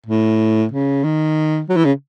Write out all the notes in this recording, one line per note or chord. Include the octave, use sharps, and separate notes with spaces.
A2
C#3
D#3
F#3
E3
C#3